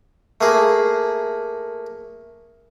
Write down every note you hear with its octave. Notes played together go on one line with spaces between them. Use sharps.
A3 A#3 G#4